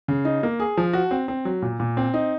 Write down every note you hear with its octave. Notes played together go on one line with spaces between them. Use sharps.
C#3
D#4
A#3
G#4
F3
F#4
C4
C4
F#3
A#2
A#2
C4
D#4